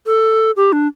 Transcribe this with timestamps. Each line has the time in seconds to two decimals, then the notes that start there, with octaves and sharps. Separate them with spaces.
0.06 A4
0.57 G4
0.73 D4